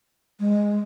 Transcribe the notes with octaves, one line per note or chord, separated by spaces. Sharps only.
G#3